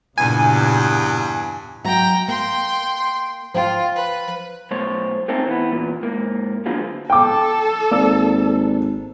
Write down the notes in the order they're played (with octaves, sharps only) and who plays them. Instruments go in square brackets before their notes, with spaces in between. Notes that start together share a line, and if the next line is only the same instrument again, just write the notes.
[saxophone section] E2 G2 [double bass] A#2 C#3 [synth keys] G#5
[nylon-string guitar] F#3 F#4 E5 [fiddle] G5 A#5
[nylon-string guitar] A#3 [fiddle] G5 C6
[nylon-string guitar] F3 G5 [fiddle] F4
[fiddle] B4
[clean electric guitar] B1 A3 C5 C#5
A3 A#3 C4 C#4 D#4 A4
E3 B3
E2 A#2
G#2 A#3
D3 F3 F#3 G#3 A#3 B3
[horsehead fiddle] A4 [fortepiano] G5 D6
[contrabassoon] G#1 [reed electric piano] A#3 D5 E6